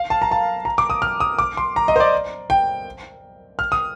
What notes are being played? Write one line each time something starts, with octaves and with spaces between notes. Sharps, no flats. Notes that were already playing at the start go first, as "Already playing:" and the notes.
Already playing: F5
A5
A#5
A5
A#5
D6
D#6
F6
D#6
D6
C6
A#5
D#5
C5
D5
G5
F6
D#6